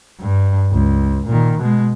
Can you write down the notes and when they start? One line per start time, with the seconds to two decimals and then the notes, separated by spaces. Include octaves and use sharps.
0.20 G2
0.72 C#2
1.27 A#2 D#3
1.59 B2 G#3